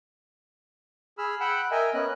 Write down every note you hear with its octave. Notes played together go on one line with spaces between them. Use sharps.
G#4 B5 E6 F6
F#5 G5 B5 E6 F#6
A#4 D#5 E5 G5 G#5
B3 C#4 D#5 F#6